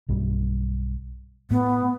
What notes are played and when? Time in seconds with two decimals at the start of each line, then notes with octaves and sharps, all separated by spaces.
0.09 B1 G2 G3
1.51 A2 B3